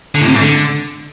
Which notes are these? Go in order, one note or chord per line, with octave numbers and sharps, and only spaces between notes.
D3
A2
C3
G#2
D3